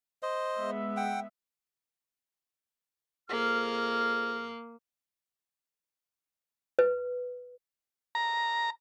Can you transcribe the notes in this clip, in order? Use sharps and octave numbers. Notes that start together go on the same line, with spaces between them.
C5 D#5
G#3 B3 E5
F#5 G5
F2 A#3 G#4 F6
B4
A#5